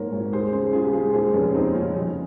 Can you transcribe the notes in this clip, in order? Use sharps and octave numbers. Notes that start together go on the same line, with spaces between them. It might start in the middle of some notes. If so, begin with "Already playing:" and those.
Already playing: G#2 A#3 A#4 C#5
G#1
D#2 G#4 C5
C#3 G#4 C5
C#3 F4 G#4
G4
G#3 F4 G#4
D#2 G#4 C5
F1 C#4
D#2 C4 D#4
C#3 C#4 F4
F2